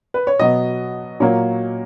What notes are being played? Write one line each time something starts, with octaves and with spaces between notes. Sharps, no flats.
B4
C#5
B2 F#3 B3 D#5
A#2 F#3 A#3 C#5